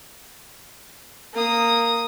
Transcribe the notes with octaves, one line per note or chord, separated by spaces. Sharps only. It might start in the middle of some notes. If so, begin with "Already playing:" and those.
A#3 D#6